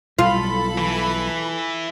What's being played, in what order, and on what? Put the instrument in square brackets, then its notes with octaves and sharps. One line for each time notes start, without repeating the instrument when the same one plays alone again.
[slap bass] B1 G3 [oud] F4 [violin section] A4 B5
[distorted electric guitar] E3